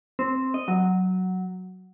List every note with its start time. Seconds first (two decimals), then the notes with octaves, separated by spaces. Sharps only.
0.19 C4
0.54 D#5
0.68 F#3